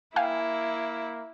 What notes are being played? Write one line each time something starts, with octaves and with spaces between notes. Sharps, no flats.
A#3 E4 F5 G5 G#5